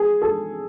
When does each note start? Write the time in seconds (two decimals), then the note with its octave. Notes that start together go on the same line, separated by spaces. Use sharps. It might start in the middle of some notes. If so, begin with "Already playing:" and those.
Already playing: G#4
0.22 A4